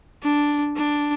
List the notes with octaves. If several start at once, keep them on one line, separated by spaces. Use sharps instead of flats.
D4
D4